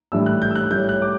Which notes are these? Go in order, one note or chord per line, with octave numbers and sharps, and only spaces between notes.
A2 E3 G3 D4 E6
F#6
G6
E6
F#6
A2 G3 C#4 G6
F#6
D6